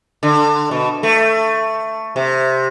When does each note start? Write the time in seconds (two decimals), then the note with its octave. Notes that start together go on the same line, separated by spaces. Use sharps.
0.23 D3
0.71 B2
1.03 A3
2.16 C3